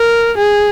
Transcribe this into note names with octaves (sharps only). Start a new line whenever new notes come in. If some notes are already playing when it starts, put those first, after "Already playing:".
Already playing: A#4
G#4